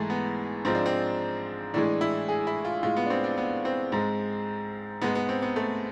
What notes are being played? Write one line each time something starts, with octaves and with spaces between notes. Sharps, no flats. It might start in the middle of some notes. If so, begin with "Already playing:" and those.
Already playing: G#2 E3 G#3 A3
B3
G#2 F3 G#3 C4
D4
C4
A2 E3 G#3 D4
E4
G#4
E4
F4
A2 G#3 F4
B3
D4
C4
D4
B3
C4
G#2 G#3
G#2 G#3 B3
B3
C4
B3
A3